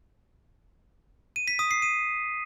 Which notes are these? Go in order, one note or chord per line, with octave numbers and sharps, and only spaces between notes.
D#7
B6
D#6
C7
D#7